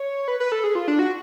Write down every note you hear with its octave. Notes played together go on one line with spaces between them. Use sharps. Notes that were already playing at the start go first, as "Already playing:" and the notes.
Already playing: C#5
B4
B4
A4
G#4
F4
D4
F#4